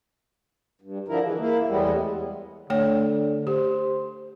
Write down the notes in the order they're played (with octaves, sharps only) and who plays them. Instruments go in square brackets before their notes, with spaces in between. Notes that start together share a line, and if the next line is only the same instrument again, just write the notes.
[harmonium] G2
D3 F3 E4 A#4
E3 G#3
A#3 E4
E2 A2 G3 G#3 B3
[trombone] D3 [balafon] A3 C#5 G5
[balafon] G4 [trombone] C5